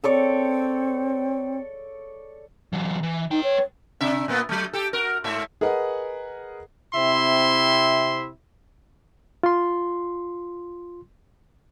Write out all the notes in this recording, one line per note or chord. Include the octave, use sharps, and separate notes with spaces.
C4 A4 C#5 D5
E3 F#3
E3
D#4 B4 G5
C#5
C3 D4 E5
A#2 A#3 B3
F#3 A3
G4 A4
F#4 A#4
G#2 A3 E5
G#4 A#4 B4 D#5 F#5
C3 C4 E4 E5 C6
F4 C6